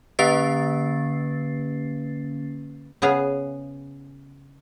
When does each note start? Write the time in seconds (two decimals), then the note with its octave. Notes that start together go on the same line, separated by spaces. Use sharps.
0.19 D3 A#3 C#4 B4 A6 C7
3.02 C#3 B3 G#4 F5